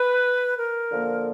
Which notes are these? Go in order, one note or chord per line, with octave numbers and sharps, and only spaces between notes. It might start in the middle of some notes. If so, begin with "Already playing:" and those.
Already playing: B4
A#4
D3 F3 A#3